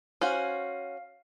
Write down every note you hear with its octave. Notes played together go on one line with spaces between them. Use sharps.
C#4 F#4 C5 F5